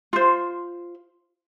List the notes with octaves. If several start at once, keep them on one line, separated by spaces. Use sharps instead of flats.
F4 C5